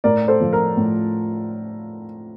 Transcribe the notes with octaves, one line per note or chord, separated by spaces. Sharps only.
A2 A#4 D5
A4 C5
F3
A#4
A2